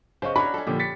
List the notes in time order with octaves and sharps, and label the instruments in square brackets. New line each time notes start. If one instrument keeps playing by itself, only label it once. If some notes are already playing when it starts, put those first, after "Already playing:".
[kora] C#3 B3 D#5 [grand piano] C5 F5 C#6
[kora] C#4 D4 A#4 [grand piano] F#4 C#5 [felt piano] B5
[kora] C#4 A4
[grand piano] A#2 D3 F3 [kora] G4
[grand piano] A6 B6 C#7